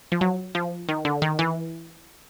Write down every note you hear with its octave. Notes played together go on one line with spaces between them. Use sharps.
F3
F#3
F3
D#3
D3
D#3
E3